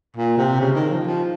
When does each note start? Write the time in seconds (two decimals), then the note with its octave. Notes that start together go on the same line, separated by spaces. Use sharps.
0.16 A#2
0.38 C3
0.60 C#3
0.75 D#3
0.90 F3
1.04 F3